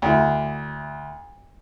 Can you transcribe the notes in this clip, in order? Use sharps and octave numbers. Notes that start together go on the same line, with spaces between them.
D2 E4